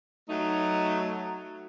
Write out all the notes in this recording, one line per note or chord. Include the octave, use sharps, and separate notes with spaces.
F#3 A3 D#4